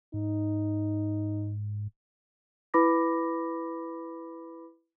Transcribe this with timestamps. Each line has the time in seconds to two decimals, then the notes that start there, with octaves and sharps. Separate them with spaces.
0.14 G#2 D#4
2.74 E4 B4 B5 D6 A#6